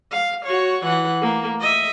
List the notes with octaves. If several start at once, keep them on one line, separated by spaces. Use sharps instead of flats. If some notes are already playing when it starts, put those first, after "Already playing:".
F5
F#4 C#5
E3 F#5
A3 A#3
D#5 E5